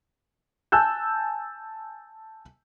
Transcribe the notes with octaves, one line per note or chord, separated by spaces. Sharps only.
G#5 A5 E6 F#6 G6